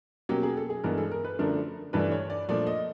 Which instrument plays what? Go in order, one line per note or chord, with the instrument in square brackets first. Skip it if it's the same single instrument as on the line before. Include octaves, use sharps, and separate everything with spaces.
[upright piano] B2 F#3 A#3 C#4 G4
G#4
A4
G#4
G2 E3 G#3 B3 A#4
A4
A#4
B4
F#2 D3 F3 A3 D4 A#4
G2 E3 A3 D4 B4
C#5
D5
A#2 F3 A3 D4 D5
D#5